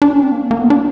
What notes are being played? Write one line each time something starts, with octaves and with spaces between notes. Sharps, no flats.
D4
C#4
C4
A#3
A#3
B3
D4